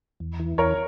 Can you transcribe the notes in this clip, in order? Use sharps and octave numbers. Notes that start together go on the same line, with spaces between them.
E2
E3
E2 A#4 C#5